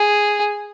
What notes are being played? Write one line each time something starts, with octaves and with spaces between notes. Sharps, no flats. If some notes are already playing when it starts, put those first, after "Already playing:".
Already playing: G#4